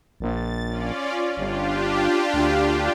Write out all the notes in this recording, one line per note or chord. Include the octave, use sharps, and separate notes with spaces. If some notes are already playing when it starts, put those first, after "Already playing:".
A#1 A6
C#4 F4 D5
G1 D4 F4 G4
D2